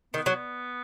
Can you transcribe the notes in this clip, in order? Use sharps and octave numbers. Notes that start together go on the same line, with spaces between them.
D#3 B3
F#3